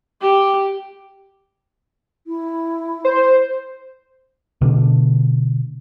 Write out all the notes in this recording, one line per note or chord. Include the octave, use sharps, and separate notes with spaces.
G4
E4
C5
B2 D3 A3